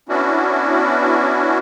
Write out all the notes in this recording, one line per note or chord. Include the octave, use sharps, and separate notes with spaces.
B3 C#4 D4 E4 F#4